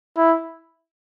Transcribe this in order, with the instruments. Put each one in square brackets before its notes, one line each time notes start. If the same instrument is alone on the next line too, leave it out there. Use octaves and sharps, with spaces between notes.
[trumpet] E4